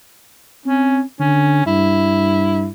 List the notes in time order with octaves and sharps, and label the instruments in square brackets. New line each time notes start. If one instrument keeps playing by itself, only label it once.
[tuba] C4 [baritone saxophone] C#4
[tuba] D3 [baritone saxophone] C#4
[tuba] G2 [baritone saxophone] E4